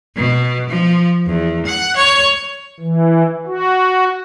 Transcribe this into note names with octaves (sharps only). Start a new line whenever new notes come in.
B2
F3
E2
F#5
C#5
E3
F#4